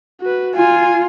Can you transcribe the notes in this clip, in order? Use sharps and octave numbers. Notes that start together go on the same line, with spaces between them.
F#4 B4
F4 G#5